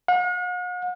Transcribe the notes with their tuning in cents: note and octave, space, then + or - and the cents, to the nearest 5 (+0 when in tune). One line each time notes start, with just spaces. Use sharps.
F#5 -45